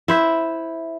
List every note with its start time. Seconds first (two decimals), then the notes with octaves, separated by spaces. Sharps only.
0.08 E4 C5 E5